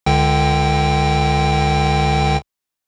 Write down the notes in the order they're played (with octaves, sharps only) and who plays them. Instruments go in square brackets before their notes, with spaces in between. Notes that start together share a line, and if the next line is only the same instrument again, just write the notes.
[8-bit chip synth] C#2 D3 G5